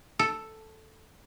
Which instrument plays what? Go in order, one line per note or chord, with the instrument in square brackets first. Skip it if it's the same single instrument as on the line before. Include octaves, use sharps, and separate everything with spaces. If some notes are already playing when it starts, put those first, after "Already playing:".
[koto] A4